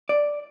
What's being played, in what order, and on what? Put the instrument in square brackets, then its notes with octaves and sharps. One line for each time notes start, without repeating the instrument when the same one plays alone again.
[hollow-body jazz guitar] D5